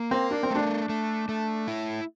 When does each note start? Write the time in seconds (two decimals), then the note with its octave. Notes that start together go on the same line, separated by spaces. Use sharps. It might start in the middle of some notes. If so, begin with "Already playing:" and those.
Already playing: A#3
0.11 C4 A#4
0.31 D4
0.43 C4
0.51 A3 D4
0.89 A3
1.29 A3
1.68 E4